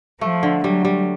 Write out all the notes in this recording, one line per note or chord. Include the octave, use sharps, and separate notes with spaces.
F3 A3
D3
F#3 G3
G3